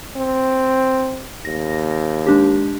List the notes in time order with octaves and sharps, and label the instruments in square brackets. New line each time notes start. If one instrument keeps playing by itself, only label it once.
[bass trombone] C4
[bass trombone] D#2 [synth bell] A#6
[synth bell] G#3 D4 G4